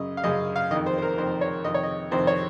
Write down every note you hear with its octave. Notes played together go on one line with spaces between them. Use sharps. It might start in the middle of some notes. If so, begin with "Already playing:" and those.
Already playing: F#2 C#3 D#5
F5
F#2 C#3 D#5
F5
F2 D#3 D#5
C5
C5
A#4
F2 D#3 C5
C#5
F2 C3 D#3 D#5
C#5
D#5
F2 C3 D#3 C5
C#5